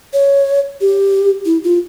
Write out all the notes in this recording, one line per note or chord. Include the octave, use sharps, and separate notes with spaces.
C#5
G4
E4
F4